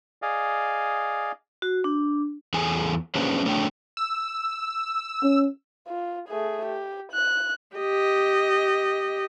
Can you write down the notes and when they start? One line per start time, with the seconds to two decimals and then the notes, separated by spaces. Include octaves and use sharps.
0.22 G#4 D5 D#5 F5
1.62 F#4
1.84 D4
2.54 E2 G#4 A4 G#5
3.15 A#3 C#4 D4 G#4 B4 C5
3.45 A3 D4 A4 C#5 G5
3.97 E6
5.23 C#4
5.87 F4
6.29 A3 G#4
6.65 G4
7.12 F#6
7.76 G4 D#5